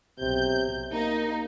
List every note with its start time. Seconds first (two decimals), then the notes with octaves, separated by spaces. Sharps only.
0.20 B1 C3 G6
0.93 A#3 D#4